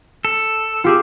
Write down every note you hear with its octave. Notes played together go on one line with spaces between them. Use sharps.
A4
F4 G4 G#4